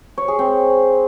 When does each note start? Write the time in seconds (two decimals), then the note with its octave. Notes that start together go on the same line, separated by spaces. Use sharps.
0.18 C#5
0.28 G#4
0.39 C4